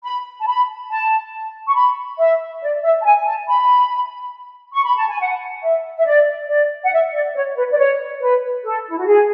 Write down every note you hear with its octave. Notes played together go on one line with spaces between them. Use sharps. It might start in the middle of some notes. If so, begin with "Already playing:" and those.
B5
A5
B5
A5
C#6
B5
E5
D5
E5
A5
G#5
A5
B5
C#6
B5
A5
G#5
F#5
E5
E5
D5
D5
F#5
E5
D5
C#5
B4
D5
C#5
B4
A4
E4
F#4
G#4